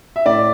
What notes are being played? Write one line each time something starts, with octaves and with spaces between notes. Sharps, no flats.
E5
A2 D5